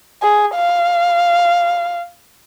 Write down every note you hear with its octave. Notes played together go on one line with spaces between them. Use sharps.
G#4
F5